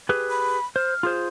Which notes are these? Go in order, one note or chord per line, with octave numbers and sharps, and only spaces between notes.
G4 G#4 B4
B5
C5 F6
F4 G#4 C5